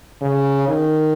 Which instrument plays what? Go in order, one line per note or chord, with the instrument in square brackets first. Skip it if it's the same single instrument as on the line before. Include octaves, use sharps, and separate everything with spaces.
[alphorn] C#3
D#3